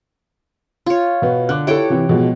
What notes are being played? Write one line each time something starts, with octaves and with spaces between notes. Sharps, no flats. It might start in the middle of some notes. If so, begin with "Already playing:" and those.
F4 C#5
B2 B3
D3 D6 F#6
E4 G4 A4 C#5 G5
C3 E3
B2 F3 G#3